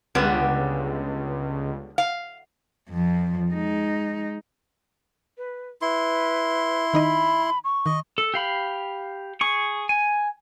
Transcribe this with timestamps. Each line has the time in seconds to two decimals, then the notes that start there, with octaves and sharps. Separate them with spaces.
0.15 C#2 D3 G3 B3
1.98 F5
2.90 F2 F3
3.51 G#3 D#4
5.38 B4
5.82 E4 B4 C6
6.94 D#3 D#4 D#5 B5
7.64 C#6
7.86 D#3 D#5
8.18 A4
8.34 G4 F5 B5
9.41 G#4 C#6
9.89 G#5